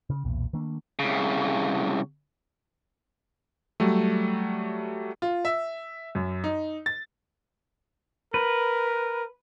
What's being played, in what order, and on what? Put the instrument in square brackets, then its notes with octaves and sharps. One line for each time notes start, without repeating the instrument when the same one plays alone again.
[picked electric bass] C#3
B1 E2 A#2
D#3 A3 A#3 D4
[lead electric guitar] C2 C#3
[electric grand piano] F#3 G3 A3
[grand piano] F4
E5
F#2
D#4
A6
[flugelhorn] A#4 [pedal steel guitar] B4